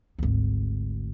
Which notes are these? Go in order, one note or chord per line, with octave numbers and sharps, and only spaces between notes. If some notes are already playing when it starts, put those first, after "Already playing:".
G#1 D2